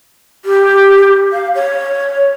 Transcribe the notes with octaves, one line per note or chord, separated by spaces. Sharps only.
G4
F5
C#5